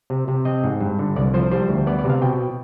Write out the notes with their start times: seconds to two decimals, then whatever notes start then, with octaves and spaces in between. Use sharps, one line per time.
0.10 C3
0.28 C3
0.45 C4 D#5
0.64 G#2
0.80 G2
0.99 D3
1.16 C2 D5
1.33 F3 C5
1.51 G3 C5
1.69 D2
1.87 B3 D5
1.99 D5
2.04 C3
2.10 F5
2.21 B2 G5